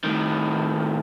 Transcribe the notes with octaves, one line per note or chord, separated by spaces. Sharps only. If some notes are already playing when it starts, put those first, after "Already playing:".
A2 D#3